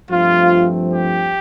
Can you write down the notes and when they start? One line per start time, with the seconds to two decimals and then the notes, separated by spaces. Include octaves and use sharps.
0.10 G2 F3 A3 C4 F4
0.91 G4